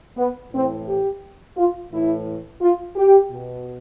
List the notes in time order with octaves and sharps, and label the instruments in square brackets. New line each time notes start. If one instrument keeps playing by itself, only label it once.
[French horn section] B3
A2 E3 C4
G4
F4
A2 E3 E4
F4
G4
B2